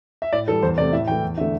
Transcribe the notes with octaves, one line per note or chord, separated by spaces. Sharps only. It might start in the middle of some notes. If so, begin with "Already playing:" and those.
E5
A2 D5
E3 G3 A4
E2 C5
C3 A3 D5
A2 E5
E3 A3 G5
E2
D3 A3 E5